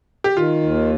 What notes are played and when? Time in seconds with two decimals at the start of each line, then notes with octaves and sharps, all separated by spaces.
0.24 G4
0.37 D#3 F4
0.63 D#2